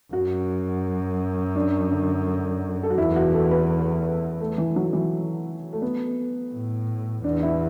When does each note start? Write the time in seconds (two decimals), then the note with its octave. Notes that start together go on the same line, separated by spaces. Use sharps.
0.13 F#2 F#4
1.55 D4
1.91 D3
2.83 A4
2.90 F#4
2.98 E2 E4
3.16 F#4
3.34 A4
3.51 B4
4.41 A3
4.58 E3
4.76 F#3
4.93 E3
5.73 A3
5.82 B3
6.53 A2
7.24 E2 D4
7.43 E4